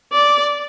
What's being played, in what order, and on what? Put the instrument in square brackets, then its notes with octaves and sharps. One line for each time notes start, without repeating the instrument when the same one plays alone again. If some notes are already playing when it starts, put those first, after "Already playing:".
[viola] D5